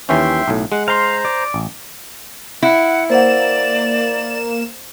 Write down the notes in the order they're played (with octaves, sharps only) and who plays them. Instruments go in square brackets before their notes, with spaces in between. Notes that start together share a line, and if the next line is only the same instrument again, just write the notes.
[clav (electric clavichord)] D#2 E3 C#4 [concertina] E5 G5 C6
[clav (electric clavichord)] B1 A2
[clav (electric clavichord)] G#3 [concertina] F#5
[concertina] C5 A#5 [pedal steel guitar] F5 C6
[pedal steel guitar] D5
[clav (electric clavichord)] A1
[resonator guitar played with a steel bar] E4 [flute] F#5
[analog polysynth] A#3 E7 [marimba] C5 E5 F#5 [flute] D5